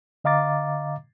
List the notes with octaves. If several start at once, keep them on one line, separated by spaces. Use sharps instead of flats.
D3 D#5 F5 A#5 D6 A6